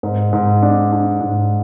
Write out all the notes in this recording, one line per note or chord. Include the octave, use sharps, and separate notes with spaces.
G#2
G#2
D4
D4
G#2